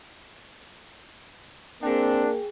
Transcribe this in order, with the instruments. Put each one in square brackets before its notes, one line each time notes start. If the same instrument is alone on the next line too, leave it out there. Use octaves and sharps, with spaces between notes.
[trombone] A#3 [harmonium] C4 [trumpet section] D4 [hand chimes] G#4 G5